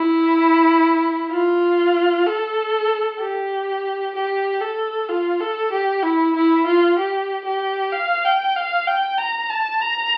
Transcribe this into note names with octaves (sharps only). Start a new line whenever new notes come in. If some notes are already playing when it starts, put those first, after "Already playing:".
Already playing: E4
F4
A4
G4
G4
A4
F4
A4
G4
E4
E4
F4
G4
G4
F5
G5
F5
G5
A#5
A5
A#5